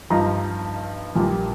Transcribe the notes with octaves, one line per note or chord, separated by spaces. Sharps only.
G2 F3 D#4 A#5
A#1 A#2 G3